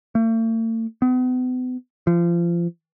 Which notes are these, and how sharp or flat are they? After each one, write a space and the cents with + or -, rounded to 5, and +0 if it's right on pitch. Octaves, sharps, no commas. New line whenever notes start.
A3 +45
B3 +40
F3 -30